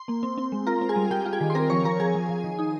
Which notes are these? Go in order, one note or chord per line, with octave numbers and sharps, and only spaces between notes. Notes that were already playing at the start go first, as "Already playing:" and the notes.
Already playing: C6
A#3
C4
C4
G#3
F4 A#4 A#5
C4
G#4 G#5
G3
G3 G4 G5
F4
G#4 G#5
D#3
C6
C4 A#4 A#5
F3 C#5 C#6
F3 A#4 A#5
F3 G#4 G#5
F3
F3
D#3
D#4